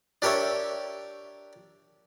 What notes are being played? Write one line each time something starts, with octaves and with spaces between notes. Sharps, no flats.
D4 G4 A#4 C#5 E5